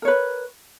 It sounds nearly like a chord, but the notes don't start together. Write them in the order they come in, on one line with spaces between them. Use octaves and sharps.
A#4 C#5 B4